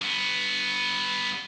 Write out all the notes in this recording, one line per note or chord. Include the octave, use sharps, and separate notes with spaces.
G2 B3